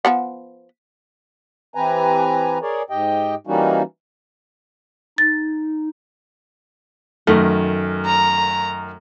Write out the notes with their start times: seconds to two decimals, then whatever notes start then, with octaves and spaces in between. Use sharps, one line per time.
0.05 F3 B3 F#5
1.75 E3 C4 G4 B4 G#5 A#5
2.62 G#4 A#4 C#5 D5
2.90 G#2 G4 D#5 G5
3.47 E3 G3 A#3 C#4 D#4 F#4
5.18 D#4 A6
7.27 F#2 D#3 A3
8.06 A#5